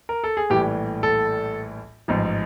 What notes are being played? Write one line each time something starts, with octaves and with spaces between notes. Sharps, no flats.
A#4
A4
G#4
A#1 A2 E3 G3 G4
A4
A1 G#2 F3